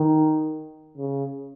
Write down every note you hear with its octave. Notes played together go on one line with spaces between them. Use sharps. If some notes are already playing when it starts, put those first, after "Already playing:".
Already playing: D#3
C#3